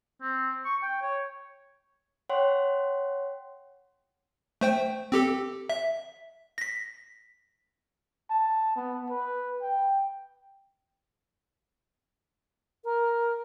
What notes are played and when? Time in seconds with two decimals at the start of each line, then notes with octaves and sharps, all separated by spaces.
0.21 C4
0.65 C#6
0.83 G5
1.02 C#5
2.30 C#5 F#5 G5 C6
4.61 A3 C5 G5
5.12 C4 G4 A4
5.69 E5
6.58 A#6 B6
8.31 A5
8.76 B3
9.10 B4
9.62 G5
12.84 A#4